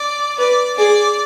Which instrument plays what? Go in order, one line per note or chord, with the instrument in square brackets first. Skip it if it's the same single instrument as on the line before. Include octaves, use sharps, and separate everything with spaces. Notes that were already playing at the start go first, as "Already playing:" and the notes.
Already playing: [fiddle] D5
[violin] B4 [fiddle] D5
[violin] G#4 [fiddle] D5